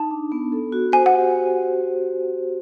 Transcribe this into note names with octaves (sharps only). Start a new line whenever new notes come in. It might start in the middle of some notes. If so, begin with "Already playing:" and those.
Already playing: D#4 A5
D4
B3
A4
F#4
C5 G#5
F#5
G4